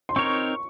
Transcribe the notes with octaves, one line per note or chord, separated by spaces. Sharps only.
C6
C4 D#4 A#4 C#5 C#6